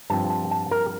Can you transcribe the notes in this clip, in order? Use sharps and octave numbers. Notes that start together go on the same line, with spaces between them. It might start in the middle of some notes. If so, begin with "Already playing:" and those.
G2 F3 C4 A5
A5
A5
A#4